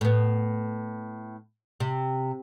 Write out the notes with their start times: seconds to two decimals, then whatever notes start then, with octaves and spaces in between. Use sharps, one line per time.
0.01 A2 B3
1.80 C3